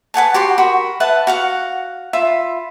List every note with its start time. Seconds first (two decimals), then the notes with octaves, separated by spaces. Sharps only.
0.14 B4 F#5 G#5 A5
0.34 F#4 G4 B5 C6
0.58 F#4 A#4 B5
1.00 B4 E5 F#5 A5
1.27 F#4 F5 F#5
2.13 F4 E5 B5